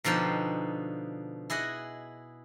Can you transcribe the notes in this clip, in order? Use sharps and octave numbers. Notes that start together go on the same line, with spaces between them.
B2 D3 F3 D#4 G5
E4 G#4 D#5 F#5